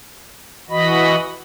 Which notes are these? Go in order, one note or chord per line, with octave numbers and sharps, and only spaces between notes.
E3 F#4 D#5 B5